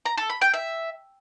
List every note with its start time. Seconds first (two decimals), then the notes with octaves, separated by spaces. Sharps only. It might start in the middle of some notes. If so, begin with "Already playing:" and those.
0.05 A#5
0.17 A4
0.29 B5
0.41 G5
0.53 E5